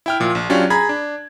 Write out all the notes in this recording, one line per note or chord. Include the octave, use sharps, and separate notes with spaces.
E4 G5 F6
A#2 F3
A#1
F#3 C#4 D4 F4 G4
G#4 A#5 B5 G#6
D4